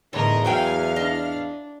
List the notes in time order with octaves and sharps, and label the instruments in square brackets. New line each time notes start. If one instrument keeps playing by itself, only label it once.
[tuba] E2 [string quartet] A2 D#3 [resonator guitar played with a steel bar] D3 [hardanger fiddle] A#4 D#5
[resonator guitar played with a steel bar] F#3 C5 G5 [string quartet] E4 F5 F6 [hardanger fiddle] G#5
[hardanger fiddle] D4 [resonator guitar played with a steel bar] D#5